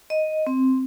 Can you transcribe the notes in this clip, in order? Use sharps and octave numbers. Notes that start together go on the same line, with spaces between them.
D#5
C4